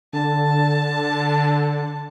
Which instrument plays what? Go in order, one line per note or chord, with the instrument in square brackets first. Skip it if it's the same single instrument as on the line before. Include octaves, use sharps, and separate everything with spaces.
[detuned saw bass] D3 [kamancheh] A5